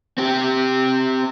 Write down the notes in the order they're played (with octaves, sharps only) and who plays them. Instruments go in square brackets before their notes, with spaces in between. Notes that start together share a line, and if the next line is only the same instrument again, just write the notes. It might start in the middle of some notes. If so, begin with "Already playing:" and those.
[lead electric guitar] C4 G4